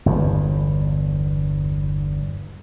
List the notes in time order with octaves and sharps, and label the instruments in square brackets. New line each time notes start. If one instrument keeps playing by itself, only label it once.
[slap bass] G1 E2